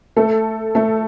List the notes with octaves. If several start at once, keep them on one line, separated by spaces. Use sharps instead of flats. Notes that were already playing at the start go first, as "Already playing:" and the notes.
A3 A4
A3 A4